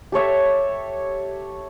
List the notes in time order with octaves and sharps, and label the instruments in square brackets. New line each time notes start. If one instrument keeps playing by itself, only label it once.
[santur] G4 A4 C#5 E5